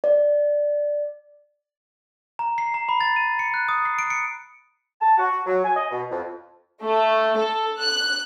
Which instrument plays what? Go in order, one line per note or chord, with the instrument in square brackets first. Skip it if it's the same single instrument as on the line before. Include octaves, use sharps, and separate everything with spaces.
[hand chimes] D5
[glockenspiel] A#5
C7
A#5
B5
A6
D#7
C#7
F#6
D#6
C7
D7
C#7
[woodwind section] A5
F#4
F#3
G#5
D#5
B2
F2
[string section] A3
A4
F#6